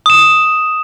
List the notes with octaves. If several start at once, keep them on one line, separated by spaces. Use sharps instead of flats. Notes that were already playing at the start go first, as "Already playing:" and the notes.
D#6 E7